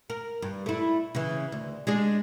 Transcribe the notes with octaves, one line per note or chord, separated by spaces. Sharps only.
A#4
G2
A3 E4
C#3 E3
D2
G#3 D4 G#4